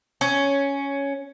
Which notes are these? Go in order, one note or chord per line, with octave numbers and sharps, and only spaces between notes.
C#4